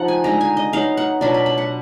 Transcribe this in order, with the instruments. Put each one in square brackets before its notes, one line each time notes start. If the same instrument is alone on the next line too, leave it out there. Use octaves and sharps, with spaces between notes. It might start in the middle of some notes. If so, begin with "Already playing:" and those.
Already playing: [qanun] F3 D#4 F#5
G#5
D3 G#3 D#4 A#5
G#5
D#5
F#3 B3 D#4 F5
F#5
B2 F#3 D4 F4 B5
B5
B5
F#5